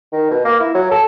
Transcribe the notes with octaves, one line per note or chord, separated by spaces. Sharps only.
D#3
B2
A#3
E4
F#3
A4